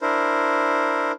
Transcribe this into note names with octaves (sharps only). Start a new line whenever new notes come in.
D4 E4 A#4 C5